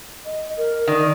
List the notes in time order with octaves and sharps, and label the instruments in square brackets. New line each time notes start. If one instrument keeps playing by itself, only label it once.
[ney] D#5
A#4
[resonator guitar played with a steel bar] D#3 [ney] D5